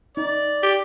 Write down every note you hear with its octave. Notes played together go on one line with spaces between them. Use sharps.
D#4 D5
G4